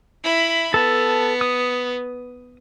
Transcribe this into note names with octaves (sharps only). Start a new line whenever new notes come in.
E4 B5
B3 A4 A5
D#6